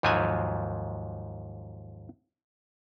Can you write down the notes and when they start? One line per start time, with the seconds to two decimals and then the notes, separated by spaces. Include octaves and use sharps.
0.03 D#2 G#2 F3 F#3 G#5